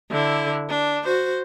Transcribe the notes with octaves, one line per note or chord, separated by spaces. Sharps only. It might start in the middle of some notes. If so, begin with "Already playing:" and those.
D3 E4
D4
F#4 C5